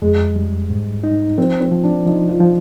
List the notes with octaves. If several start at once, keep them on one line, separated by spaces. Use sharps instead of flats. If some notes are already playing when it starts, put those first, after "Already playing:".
F2 G#3
G3
G#2
D#4
F3 C4
C4
F3
D4
F3 D#4
F4
F3